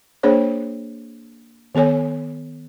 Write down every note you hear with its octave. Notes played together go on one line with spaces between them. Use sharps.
A#3 D4 G#4 C5 C#5
D#3 B3 A4 C#5 G#5